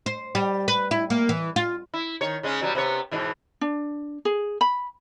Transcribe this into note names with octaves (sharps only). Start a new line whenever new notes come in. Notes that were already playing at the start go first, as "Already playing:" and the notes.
C5
G3
B4
E4
A#3
E3
F4
E4
D#3 C#5
C#3 G#3 C#4
B2 F#3 G3
C3 B3 C#5
G#2 B2 E3
D4
G#4
B5